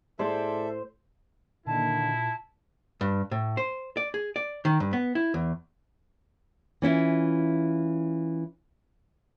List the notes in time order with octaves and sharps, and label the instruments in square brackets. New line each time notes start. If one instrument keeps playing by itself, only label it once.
[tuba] A2 [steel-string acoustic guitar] G#4 D5 [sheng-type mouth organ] A4 E5 [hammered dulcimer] C5
[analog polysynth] A#2 [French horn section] D3 D#3 [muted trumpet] E4 [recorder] A5
[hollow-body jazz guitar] G2
A2
C5
D5
G#4
D5
D#3
G2
B3
E4
E2
[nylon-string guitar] E3 C#4 E4 F4